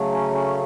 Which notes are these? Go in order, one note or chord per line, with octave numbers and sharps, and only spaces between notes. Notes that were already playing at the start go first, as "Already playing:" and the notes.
Already playing: C#3 F#3 A3
C#4
C#4